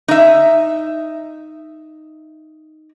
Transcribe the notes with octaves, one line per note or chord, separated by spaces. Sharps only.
D#4 E5